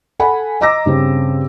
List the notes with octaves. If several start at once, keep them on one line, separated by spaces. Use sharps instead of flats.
A4 F#5 G#5 B5
D#5 A#5 D6 E6 A#6
G2 C#3 C4